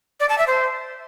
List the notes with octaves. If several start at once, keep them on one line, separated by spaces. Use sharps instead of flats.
D5
A5
E5
C5